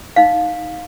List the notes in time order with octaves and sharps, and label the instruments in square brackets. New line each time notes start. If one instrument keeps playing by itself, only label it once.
[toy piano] D#4 F5